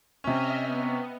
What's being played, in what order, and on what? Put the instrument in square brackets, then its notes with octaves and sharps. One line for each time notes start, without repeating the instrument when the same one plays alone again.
[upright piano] C3 C#4 [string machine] D#5 E5 F6
[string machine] B3